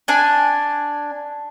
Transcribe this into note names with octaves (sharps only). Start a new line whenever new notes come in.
D4 G#5